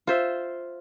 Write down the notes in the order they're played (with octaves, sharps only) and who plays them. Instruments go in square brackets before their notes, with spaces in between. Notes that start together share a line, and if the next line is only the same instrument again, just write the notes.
[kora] F4 C5 E5